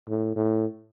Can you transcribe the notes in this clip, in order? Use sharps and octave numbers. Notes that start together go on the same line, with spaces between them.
A2
A2